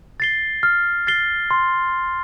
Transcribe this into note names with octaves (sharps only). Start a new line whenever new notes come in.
A6 C7 G7
F6
A6 C7 G7
C6